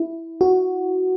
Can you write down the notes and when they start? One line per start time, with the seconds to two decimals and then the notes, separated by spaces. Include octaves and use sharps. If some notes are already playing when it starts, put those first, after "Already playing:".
Already playing: E4
0.41 F#4